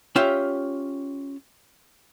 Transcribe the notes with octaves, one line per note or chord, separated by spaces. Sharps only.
C#4 F4 G4 E5 G5